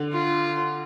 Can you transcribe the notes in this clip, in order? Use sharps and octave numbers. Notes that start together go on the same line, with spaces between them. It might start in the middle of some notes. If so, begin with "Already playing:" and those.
Already playing: D3
F4